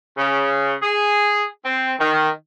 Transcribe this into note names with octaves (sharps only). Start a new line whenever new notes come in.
C#3
G#4
C4
D#3